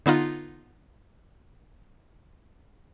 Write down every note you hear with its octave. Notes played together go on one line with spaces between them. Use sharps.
D3 B3 D#4 F4